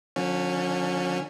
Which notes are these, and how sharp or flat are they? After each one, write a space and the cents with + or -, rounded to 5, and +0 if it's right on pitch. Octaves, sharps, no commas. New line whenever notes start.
D3 +25 F3 +45 C#4 +0